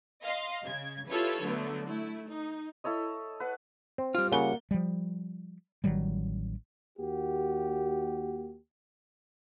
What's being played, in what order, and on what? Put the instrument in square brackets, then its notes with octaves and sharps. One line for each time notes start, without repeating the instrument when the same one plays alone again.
[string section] D#5 F5 C6
C#3 G#6
E4 F4 G4 A4 B4 C#5
D3 F#3 A3 B3
A3 E4
D#4
[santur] E4 A4 C#5 D#5
B4 F#5
[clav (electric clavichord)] C4
[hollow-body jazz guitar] G3 F4 [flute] F6
[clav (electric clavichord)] C#3 [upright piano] A#3 G7 [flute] F#5
[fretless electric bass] F3 G3
A1 D#3 F#3 G3
[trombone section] D#2 A#3 F#4 G4